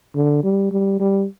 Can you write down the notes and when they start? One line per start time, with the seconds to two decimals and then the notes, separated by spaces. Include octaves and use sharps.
0.15 D3
0.44 G3
0.72 G3
1.00 G3